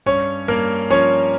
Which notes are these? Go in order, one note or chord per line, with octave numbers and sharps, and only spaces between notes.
G2 C#4 C#5
G2 A#3 A#4
F3 C#4 C#5